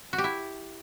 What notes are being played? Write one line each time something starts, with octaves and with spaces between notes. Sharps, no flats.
F#4
G4
E4